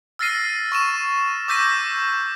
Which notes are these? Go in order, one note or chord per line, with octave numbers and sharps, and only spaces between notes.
E6 F6 A6 A#6 C7 D#7
C#6 D#7 E7
D6 E6 G6 A#6 B6 D#7